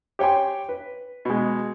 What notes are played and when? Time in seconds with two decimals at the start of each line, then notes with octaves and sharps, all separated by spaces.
0.19 G4 C#5 G5 G#5 C6
0.69 B4
1.25 B2 G#3